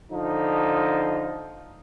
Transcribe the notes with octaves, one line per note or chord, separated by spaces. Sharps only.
D3 F3 D#4